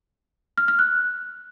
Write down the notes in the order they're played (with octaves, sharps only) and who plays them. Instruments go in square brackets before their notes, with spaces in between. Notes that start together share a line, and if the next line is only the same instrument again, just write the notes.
[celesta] F6
F6
F#6